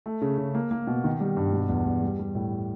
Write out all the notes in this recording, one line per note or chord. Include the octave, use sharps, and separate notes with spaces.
A3
C#3
C#3
A#3
A#3
B2
D#3
G3
G2
B2
E2
E2
G3
G3
A2